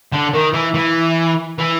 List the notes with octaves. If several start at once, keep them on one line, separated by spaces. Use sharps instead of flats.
D3
D#3
E3
E3
E3